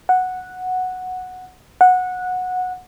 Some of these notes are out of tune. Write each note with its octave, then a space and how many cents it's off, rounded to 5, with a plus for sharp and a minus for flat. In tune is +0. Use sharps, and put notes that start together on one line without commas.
F#5 -5
F#5 -15